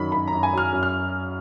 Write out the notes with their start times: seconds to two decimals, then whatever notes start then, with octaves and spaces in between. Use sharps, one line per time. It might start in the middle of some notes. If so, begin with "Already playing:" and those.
Already playing: F#2 D#3 F#3 B5
0.12 F#2 B5
0.27 F#2 A#5
0.43 G#5
0.53 F#3 F6
0.73 F#2
0.83 F6